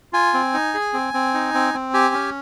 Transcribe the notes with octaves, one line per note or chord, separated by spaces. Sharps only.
F4 G#5
C4
D#4
G#4
C4
C4
D#4
C4
C4
G4 G#5
C#4